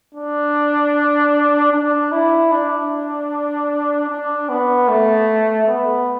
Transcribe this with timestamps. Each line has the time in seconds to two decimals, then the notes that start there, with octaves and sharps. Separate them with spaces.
0.15 D4
1.73 D4
2.12 E4
2.52 D4
4.10 D4
4.49 B3
4.89 A3
5.68 B3